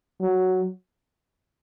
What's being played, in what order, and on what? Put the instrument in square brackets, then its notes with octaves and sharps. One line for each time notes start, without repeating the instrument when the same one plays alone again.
[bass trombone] F#3